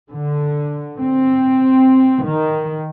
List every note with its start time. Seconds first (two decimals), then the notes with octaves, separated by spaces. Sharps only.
0.11 D3
1.00 C4
2.24 D#3